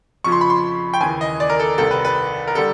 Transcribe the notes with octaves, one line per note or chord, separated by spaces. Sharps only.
F2 C#3 F3 C#6
C6
B5
C6
G5
D#2 C#3 E3 G#5
D#5
D5
A#4
A4
C2 C3 D#3 A4
B4
B4
A#4
D3 G3 A4